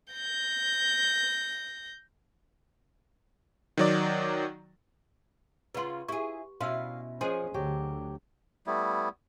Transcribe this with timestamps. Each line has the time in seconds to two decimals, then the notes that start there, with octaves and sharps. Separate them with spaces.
0.13 G6 A#6
3.77 D#3 F#3 D5
5.75 C#3 F4 B4 F#5 C6
6.08 E4 G4 G#4 C#6
6.60 B2 C#4 E4 F5 C6 E6
7.21 F3 C#4 G#4 C5 D#5 C6
7.54 D2 D3 F#3 G4
8.67 G3 A3 B3 E4